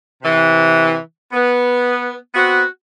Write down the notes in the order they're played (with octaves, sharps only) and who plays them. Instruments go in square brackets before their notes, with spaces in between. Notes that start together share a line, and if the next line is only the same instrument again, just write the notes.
[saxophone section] C3 E3
B3
B3 C4 F#4